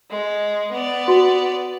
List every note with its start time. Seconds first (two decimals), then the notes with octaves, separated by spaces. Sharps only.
0.11 G#3
0.72 B3 D5
1.08 F#4